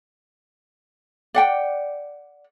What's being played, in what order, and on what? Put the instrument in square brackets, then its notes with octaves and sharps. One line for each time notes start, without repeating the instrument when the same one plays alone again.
[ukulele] D5 F#5 G5